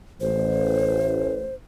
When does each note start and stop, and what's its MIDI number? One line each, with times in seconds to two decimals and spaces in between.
0.21 1.46 33
0.21 1.55 72